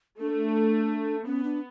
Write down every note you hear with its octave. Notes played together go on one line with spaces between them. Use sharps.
A3 D4
B3 C#4
D4